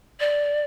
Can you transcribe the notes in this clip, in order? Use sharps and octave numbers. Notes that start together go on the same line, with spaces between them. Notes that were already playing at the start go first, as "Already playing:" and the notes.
D5